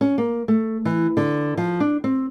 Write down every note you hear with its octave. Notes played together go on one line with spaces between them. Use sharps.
C#4
A#3
A3
E3
D3
F3
D4
C4